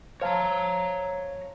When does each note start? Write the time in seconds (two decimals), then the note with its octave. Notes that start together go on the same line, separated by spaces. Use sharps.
0.22 C5 C#5 F5 A5 A#5